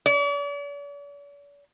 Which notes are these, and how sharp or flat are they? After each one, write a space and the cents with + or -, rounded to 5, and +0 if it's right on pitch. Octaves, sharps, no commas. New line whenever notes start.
D5 -45